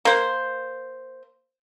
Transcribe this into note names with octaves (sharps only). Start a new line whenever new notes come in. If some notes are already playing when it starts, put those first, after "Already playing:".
A#3 C5